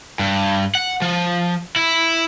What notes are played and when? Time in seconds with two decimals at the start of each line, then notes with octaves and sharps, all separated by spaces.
0.19 G2
0.75 F#5
1.02 F3
1.76 E4